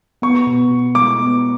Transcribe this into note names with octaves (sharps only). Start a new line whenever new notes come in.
B3 C#6
B2
B2
G#3 D6
B3